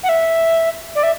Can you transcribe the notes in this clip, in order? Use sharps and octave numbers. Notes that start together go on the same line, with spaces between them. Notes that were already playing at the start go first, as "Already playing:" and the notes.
F#5
E5
D5
E5